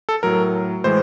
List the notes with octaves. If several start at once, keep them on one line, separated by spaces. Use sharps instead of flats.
A4
A2 F#3 A#4
A2 E3 G#3 C5